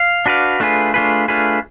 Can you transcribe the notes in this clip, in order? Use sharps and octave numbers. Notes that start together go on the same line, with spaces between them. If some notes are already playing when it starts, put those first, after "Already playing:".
Already playing: F5
D4 F#4 B4 D5 F5
A3 D4 F4 G#4 B4
A3 D4 F4 G#4 B4
A3 D4 F4 G#4 B4